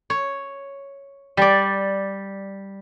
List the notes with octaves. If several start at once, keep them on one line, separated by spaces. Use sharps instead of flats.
C#5
G3 D5